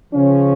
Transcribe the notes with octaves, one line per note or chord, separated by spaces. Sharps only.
C#3 F3 C#4